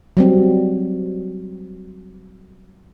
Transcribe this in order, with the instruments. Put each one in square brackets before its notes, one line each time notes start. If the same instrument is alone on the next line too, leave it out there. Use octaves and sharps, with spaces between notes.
[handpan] F#3 G3 C4